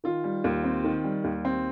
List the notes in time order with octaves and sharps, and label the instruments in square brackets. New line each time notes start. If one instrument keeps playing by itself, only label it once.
[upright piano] D#3 F4
G3
D#2
C4
D#3
G3
D#2
C4